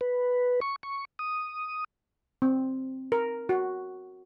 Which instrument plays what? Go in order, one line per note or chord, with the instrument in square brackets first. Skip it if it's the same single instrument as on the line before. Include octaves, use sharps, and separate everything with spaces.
[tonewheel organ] B4
C#6
C#6
D#6
[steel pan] C4
A#4
F#4